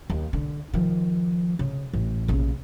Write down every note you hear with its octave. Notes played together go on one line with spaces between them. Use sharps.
D#2
D3
D#3 F3
C#3
A1
A#1 C#3